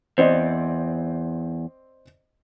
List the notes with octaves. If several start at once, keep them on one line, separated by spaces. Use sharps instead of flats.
E2 C4 D5 D#5